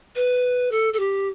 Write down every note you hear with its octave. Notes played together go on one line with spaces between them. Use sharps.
B4
A4
A4
G4